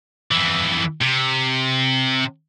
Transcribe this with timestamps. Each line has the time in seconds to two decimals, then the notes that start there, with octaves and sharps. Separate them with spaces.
0.31 F2 E3
1.02 C3